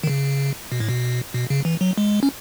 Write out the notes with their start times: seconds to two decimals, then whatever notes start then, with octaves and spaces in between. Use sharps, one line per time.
0.03 D#3
0.07 C#3
0.72 B2
0.80 A2
0.89 B2
1.34 B2
1.50 C#3
1.65 E3
1.81 F#3
1.98 G#3
2.23 C#4